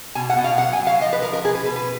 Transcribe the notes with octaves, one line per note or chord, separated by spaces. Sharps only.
B2 G#5
F#5
B2
F5
F#3 F#5
G#5
F#3
F5
F3 D#5
B4
F3 A#4
A#4
B2 G#4
B4
B2 B4
B4